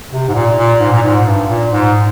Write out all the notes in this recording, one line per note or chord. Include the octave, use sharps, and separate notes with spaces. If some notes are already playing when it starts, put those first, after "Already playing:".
C3
G#2
A#2
A#2
G#2
A#2
G#2
G2
A#2
G#2